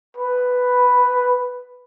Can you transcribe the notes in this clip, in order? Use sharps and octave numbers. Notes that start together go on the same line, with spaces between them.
B4